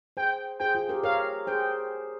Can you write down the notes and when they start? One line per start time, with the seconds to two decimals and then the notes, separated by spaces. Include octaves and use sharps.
0.17 G#4 C5 G5
0.60 G#4 C5 G5
0.75 F4 G#4
0.89 G4 A#4
1.03 A#4 C#5 F5
1.47 G#4 C5 G5